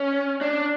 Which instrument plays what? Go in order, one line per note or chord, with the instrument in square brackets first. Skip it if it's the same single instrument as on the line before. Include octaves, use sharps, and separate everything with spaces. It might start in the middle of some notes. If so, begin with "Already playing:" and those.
Already playing: [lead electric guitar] C#4
D4